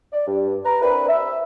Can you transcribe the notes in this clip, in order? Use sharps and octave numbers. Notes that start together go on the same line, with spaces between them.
D5
G2
B4 A#5
C4 D4 E4 A#4 B4
E5